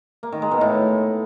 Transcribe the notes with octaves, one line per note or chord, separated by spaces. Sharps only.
A#3
D#3
G#3
B2
A2